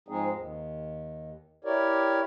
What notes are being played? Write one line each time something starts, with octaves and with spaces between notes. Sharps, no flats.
G#2 F3 G#3 C4 D#4 G#4
D#2
E4 G4 A#4 C#5 D5